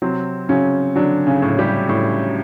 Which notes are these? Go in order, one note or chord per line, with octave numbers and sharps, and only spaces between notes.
C3 F#3 C4
C#3 F#3 C#4
D3 F#3 D4
C#3 C#4
A2
G3 G4
A2